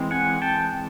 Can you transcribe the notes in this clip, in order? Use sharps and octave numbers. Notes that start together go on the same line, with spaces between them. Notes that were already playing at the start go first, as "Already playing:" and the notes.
Already playing: E3 G#3 C4
F#5 G#5
G5 A5